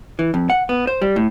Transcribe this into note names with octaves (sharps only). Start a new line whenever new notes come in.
E3
F2
F#5
B3
C5
G3
A2